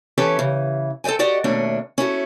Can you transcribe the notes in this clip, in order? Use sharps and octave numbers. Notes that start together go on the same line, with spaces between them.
E3 C#4 G4 A4 B4
C#3 E3
A4 C5 D#5 G5 G#5
F#4 G4 D5 D#5 F#5 G5
D#2 B2 A3 C#4 D4
C#4 E4 F#4 A4